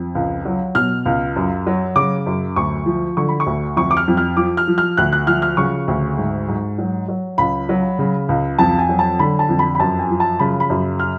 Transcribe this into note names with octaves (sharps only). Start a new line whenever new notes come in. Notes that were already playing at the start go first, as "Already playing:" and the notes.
Already playing: F2
C#2
F#3
B2 F6
C#2
F#2
F#3
C#3 D6
F#2
D2 C#6
F3
D3 C#6
B5
C#6
D2
F2 C#6
D6
F6
F2
F6
F3 D6
F6
F3
F6
D2 F#6
F#6
F3 F6
F6
C#3 C#6
D2
G#2
G#2
F#3
F#3
C#2 B5
F#3
C#3
C#2
F2 A5
G#5
F#3
A5
D3 B5
A5
F2
B5
B5
F#2 A5
G#5
F3
A5
C#3 B5
B5
F#2
F6